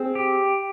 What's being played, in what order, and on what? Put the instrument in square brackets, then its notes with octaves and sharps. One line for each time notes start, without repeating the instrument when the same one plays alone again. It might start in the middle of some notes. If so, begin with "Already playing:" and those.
Already playing: [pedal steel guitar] C4 [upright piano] G#4
[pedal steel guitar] G4